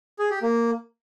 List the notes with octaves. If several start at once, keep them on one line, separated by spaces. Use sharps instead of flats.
G#4
G4
A#3